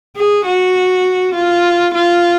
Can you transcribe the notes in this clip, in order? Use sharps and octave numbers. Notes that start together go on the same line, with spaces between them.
G#4
F#4
F4
F4